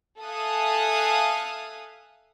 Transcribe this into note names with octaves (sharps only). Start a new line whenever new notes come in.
A4 E5 F5 G#5 D#6 F#6